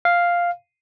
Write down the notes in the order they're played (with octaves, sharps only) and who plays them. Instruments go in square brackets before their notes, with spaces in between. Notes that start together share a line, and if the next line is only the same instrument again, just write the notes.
[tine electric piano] F5